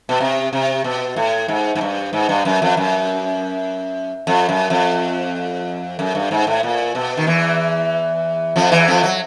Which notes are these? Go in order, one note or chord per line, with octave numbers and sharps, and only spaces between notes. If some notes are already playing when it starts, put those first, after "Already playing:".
B2
C3
C3
B2
A2
G#2
G#2
G2
G#2
G2
F#2
F2
F#2
F2
F#2
F2
F#2
G2
G#2
A2
A#2
B2
D#3
E2 E3
F2 F3
E2 E3
F2 F3
F#3